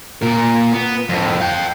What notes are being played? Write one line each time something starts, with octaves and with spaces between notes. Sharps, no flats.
A#2 A#4
B3
F2 A2
F5 G5